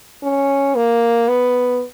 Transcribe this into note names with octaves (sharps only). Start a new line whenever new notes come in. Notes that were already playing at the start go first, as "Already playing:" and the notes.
C#4
A#3
B3